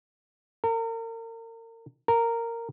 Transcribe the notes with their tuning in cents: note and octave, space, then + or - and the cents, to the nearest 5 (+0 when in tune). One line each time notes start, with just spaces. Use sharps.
A#4 -35
A#4 -10